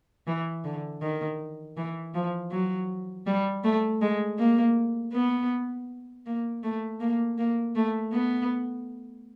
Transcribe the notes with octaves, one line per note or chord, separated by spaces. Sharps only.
E3
D3
D#3
E3
F3
F#3
G3
A3
G#3
A#3
B3
A#3
A3
A#3
A#3
A3
B3